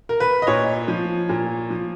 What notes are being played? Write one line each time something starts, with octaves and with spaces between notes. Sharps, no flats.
A#4
B4
D#5
A#2 C#5
F3
A#2
F3